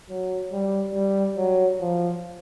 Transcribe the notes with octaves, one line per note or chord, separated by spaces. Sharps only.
F#3
G3
G3
F#3
F3